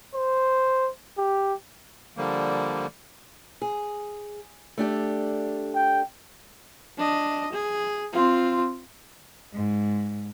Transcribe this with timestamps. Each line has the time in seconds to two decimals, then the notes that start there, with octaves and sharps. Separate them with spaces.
0.15 C5
1.18 G4
2.17 D3 F3 G3 A#3
3.62 G#4
4.78 A3 D4 G4
5.74 G5
6.98 D4 D#5
7.53 G#4
8.13 C4 F4
9.54 G#2